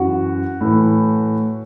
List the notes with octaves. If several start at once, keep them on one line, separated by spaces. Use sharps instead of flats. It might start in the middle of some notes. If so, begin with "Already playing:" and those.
Already playing: F#2 E3 F#4 F#5
A2 E3